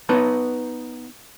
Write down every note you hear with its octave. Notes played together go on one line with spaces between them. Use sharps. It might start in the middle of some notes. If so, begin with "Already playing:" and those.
B3 D#4 B4 A5